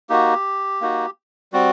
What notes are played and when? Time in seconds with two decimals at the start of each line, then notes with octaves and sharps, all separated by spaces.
0.09 A#3 D#4 F#4 G4
0.81 A#3 D#4 F#4
1.52 G3 C4 F#4